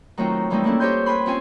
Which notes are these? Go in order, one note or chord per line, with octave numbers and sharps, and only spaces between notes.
D#3 F#3 A3 C4 D#4 F4
D#3 E3 G3 A3 C4 D#4
A#3 C#4 D4 E4 A4
G4 C5 C#5 D#5 C6 G6
B4 G5 G#5 B5 C6
C4 C#4 F4 G5 G#5